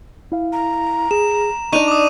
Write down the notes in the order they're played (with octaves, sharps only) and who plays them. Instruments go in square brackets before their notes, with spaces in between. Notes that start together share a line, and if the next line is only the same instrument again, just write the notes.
[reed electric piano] E4 F5
[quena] A#5
[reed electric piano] G#4 [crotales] E7
[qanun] D4 D#4 [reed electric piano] D5 D#5 [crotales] C#6 D#7 F7
[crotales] D6 D#6